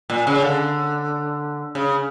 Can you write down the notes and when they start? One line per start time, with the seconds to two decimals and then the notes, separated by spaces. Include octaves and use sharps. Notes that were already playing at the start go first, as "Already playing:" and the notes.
0.10 A#2
0.27 C#3
0.42 D3
1.75 C#3